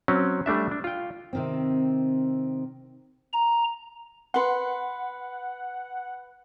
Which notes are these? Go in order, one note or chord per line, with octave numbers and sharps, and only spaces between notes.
F#3 C4 C#4
G3 A3 D4 E5
D4
F4 G5
C3 D#3 C4
A#5
B4 F#5 C6